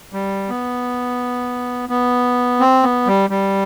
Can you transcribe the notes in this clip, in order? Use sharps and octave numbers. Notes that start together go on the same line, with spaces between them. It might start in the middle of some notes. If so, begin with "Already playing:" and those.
G3
B3
B3
C4
B3
G3
G3